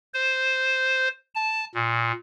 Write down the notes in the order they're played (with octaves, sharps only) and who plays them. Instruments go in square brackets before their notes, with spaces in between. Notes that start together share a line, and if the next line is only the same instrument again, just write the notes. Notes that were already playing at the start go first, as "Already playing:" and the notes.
[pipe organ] C5
A5
A#2